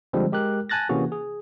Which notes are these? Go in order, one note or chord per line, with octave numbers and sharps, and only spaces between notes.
D3 F3 G3 G#3 C4
G#3 G4 A#4 F#6
G#5 A5 F#6 A6 A#6
C3 E3 A#3 C#4 F#4 G#4
G#4